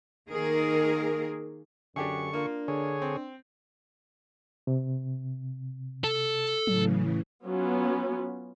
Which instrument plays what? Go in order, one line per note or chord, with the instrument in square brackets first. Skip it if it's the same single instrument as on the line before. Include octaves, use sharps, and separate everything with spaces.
[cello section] D#3 A#3 G#4 A#4
[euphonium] F#2 [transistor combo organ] D3 C#6 [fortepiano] D4 G4 G#4
[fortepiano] A#3 F4 [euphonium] D4
[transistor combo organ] D3 G#4 C#5
[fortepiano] C4
[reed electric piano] C3
[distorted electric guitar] A4
[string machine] A2 C#3 E3 [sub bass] F#3
[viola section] F#3 B3 C#4 F4